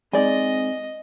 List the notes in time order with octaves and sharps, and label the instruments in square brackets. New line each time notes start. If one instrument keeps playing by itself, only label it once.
[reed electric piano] G#3 D#4 [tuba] C4 [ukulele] D5 G#5 [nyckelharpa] D#5